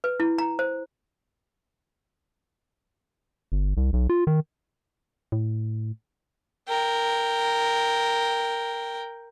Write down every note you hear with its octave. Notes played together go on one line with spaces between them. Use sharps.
B4
E4
A#5
C5
G1
C2
B1
F4
D#3
A2
A#4 G5